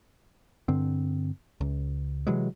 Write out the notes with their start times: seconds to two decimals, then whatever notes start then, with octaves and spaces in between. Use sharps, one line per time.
0.68 G2 D3 C4
1.61 C#2
2.27 C3 E3 F#3 G#3